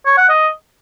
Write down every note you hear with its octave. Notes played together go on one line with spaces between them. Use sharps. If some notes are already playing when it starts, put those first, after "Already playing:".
C#5
F#5
D#5